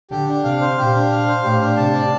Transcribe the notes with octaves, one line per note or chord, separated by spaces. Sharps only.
D3 G4
D4
C3 F5
C5
A#2 G4
D4
F5
C5
A2 G4
D4
C3 A5
D5